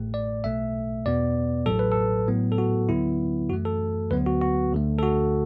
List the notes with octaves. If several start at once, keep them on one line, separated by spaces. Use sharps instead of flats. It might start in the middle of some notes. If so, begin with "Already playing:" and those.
Already playing: A1 A2 A3
D5
B1 B2 A3 E5
E2 B2 B3 D5
A1 A2 F#3 A4
B4
A4
A2 F#3 B3
A4
F#4
D2 D3 F#3 B3 E4
F#2 E3 A3 F#4
A4
D2 D3 F#3 B3 B4
F#4
F#4
D2 D3 A3
A4
F#4